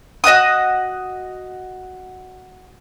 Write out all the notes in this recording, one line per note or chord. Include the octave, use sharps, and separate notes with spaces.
F#4 D#5 F#5 D#6